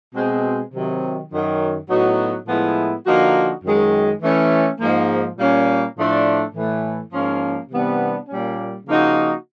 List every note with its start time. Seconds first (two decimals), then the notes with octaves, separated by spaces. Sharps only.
0.15 B2 G#3 C4
0.73 C3 D#3 F#3
1.32 F#2 D#3 F#3
1.89 A2 F#3 B3 D#4 F#4
2.47 A2 F3 G#3 B3 E4
3.05 D3 F3 A#3 D#4 F#4
3.64 F#2 D#3 G#3
4.22 E3 A3 C#4
4.80 G#2 F3 A#3
5.39 A#2 G3 A#3 C#4
5.97 A2 F3 A3 D4
6.54 A2 E3 A3
7.12 G#2 F3 A#3 C#4
7.71 C3 E3 G3 B3 D4
8.29 A#2 G3 A#3 C#4
8.87 C#3 F3 A#3 D#4 F#4